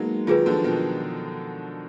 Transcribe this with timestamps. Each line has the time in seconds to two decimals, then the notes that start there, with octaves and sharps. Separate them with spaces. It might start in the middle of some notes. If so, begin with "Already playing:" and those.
Already playing: F#3 G#3 A#3 B3 D#4 G#4
0.27 D#3 F#3 F4 G#4 B4
0.46 D3 F3
0.64 B2 D#3